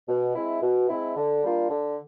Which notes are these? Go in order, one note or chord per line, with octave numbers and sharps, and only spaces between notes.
B2
G#3 C4 E4
B2
G#3 C4 E4
D3
G3 A#3 D4 F4
D3